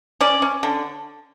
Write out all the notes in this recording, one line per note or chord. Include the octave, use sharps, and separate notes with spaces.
C#4 D5
C#4
D3